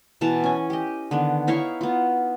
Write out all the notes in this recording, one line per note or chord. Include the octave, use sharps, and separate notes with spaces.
B2 E3 A5 A#5
C#4 G#5
G4 D#5
D3 D#3 B3
D#4 E4 C#5 F5
B3 F4